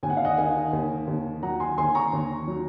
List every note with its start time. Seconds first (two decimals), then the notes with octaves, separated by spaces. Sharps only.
0.03 D#2 G#5
0.10 F#5
0.17 F5
0.25 D#5 F#5
0.38 D#3 F5 G#5
0.73 D#2
1.07 D#2
1.43 F#3 F#5 A#5
1.60 G#5 C6
1.78 D#2 G#5 C6
1.95 A#5 C#6
2.13 D#2
2.47 F#3